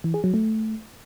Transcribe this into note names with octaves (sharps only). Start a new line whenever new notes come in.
E3
G#4
F#3
A3